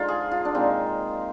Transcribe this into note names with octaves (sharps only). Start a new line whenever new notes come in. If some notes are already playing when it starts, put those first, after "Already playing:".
Already playing: D3 F3 G#3 D#4 F4
G#4
F4
D4
A#2 G#3 C4 D#4